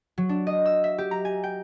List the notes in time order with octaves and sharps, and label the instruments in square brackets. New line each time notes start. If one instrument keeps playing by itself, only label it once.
[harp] F#3
D4
D#5
E6
E5
G4
A#5
G#5
G5